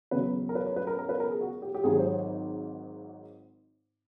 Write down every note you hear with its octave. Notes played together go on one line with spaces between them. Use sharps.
E2 C#3 F#3 B4
A#4
B4
C#5
B4
A#4
A#4
B4
A#4
G#4
F#4
G4
G4
G#1 G#2 D#3 F#3 G#4
C5
C#5